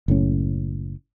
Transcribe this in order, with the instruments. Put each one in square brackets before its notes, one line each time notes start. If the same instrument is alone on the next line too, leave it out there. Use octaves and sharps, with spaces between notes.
[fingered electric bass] F#1 A2 C#4